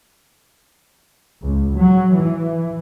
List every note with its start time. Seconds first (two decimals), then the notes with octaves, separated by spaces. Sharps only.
1.46 C#2
1.76 F#3
2.16 E3